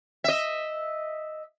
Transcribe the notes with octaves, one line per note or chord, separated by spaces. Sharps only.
D#5 E5